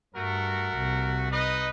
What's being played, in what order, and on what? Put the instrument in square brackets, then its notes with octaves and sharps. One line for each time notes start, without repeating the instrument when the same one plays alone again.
[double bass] G2 [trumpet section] A3 F#4 A#4
[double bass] C2
[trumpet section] D#4 B4 D#5